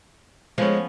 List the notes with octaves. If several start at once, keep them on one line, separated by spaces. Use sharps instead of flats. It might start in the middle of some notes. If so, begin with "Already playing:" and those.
F3 G#3 B3 C#4 C5 C#5